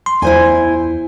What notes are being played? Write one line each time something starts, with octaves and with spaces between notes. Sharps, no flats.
C6
E2 E4 C5 G#5